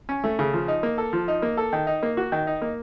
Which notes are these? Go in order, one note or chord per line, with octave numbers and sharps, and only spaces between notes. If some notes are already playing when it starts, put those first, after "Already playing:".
C#4
A3
C#3
F3
D#4
A#3
A4
F3
D#4
A#3
A4
D#3
D#4
A#3
F#4
D#3
D#4
A#3